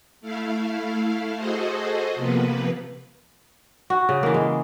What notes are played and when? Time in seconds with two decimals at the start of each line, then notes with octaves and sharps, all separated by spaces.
0.21 A3 E4 F5
1.37 F#4 G#4 A4 C5 D#5
2.15 C3 F3 A#3 B3 B4
3.90 F#4
4.09 C#3
4.23 E3 A#3
4.34 G#3